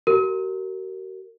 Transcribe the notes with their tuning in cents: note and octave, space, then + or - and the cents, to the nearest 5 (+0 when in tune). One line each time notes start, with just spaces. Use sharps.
F#4 +45 A#4 -15